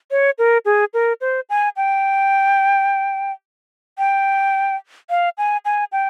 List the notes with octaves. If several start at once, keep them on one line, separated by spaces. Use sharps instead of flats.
C#5
A#4
G#4
A#4
C5
G#5
G5
G5
F5
G#5
G#5
G5